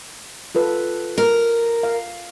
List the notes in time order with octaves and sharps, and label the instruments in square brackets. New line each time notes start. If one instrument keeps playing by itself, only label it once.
[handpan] F4 A4 B4
[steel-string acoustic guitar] A#4
[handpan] F5